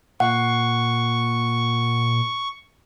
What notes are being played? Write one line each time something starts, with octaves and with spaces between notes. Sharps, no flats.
A#2 F#5 C#6